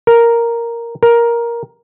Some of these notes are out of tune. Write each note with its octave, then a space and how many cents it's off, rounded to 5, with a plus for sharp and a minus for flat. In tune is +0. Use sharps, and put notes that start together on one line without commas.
A#4 +0
A#4 +10